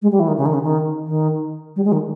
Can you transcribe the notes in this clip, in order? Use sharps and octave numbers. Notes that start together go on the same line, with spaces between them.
G#3
G3
E3
D#3
C#3
D#3
C#3
D#3
D#3
G3
G#3
D#3